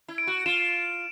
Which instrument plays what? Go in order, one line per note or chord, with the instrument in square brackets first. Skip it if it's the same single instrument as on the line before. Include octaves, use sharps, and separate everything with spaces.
[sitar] E4
[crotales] D7
[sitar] F#4
[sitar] F4 [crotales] E7